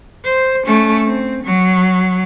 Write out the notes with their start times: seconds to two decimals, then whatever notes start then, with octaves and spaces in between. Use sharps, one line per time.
0.25 C5
0.67 A3 C#4
1.06 C4
1.44 F#3